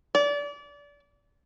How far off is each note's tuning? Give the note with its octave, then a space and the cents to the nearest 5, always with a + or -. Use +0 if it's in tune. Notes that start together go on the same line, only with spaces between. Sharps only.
D5 -30